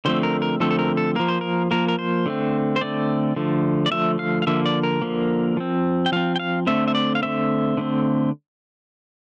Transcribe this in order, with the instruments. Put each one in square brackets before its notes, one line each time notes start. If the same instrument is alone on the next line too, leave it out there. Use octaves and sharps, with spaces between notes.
[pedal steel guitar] D3 F3 A3 C4 C5
A#4
A#4
D3 F3 A3 C4 A4
A4
A#4
A4
F3 A#3 A#4
C5
A#4
F3 A#3 A#4
A#4
C5
D3 A3 C4
C5
D3 A3 C4 D5
D3 F3 A3
D5
D3 F3 A3 E5
F5
F5
D3 F3 A#3 E5
D5
A#4
D3 F3 A#3
F3 C4
G5
F3 C4 F5
G5
F5
D3 A3 C4 E5
E5
D5
F5
D3 A3 C4 E5
D3 A3 C4